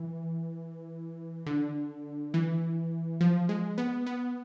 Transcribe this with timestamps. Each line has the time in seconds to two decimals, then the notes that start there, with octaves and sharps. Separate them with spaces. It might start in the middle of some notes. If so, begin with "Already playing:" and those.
Already playing: E3
1.46 D3
2.34 E3
3.21 F3
3.49 G#3
3.78 B3
4.06 B3